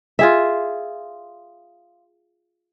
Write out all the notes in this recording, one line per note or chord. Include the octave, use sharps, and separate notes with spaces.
F4 G#4 E5